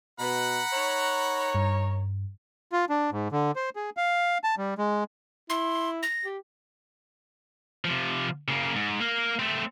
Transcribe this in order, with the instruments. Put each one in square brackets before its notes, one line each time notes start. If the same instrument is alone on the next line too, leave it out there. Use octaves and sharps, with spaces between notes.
[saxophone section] B2 [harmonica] F#5 B5 [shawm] A#5
[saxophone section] D#4 A#4 C#5
[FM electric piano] G2
[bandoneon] F4
D4
G#2
D3
C5
G#4
F5
A5
G3
G#3
[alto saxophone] E4 [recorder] C6
[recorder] A#6
[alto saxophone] G4
[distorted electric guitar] C3 F3
C#3 A#3
G#2
A#3 A#4
A3 C4